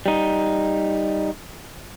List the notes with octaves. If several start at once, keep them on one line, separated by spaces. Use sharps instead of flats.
G3 D#4